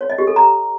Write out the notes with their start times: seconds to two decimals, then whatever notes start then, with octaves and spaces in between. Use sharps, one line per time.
0.01 C#5
0.10 D#5
0.18 G4
0.27 A4
0.36 A#5